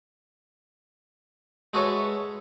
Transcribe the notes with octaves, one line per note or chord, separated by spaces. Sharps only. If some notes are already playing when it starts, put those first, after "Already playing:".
G#3 F#4 A4 B4 C#5 E5